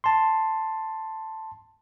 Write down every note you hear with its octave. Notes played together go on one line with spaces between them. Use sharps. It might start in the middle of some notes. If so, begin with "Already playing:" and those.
A5 C6